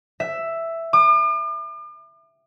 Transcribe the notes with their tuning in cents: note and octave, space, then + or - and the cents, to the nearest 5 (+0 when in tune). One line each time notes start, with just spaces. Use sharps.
E5 +5
D6 +45